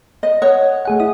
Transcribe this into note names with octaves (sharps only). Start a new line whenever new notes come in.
D#5
C#5 D#5 F#5
A3 G#4 F#5
E4 D#6